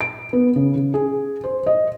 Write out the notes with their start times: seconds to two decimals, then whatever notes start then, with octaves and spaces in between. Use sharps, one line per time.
0.01 D7
0.33 B3
0.56 C#3
0.76 C#3
0.94 G#4
1.44 C5
1.66 D#5